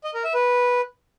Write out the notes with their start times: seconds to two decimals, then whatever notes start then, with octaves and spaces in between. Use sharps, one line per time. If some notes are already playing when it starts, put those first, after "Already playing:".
0.04 D#5
0.14 A#4
0.24 E5
0.34 B4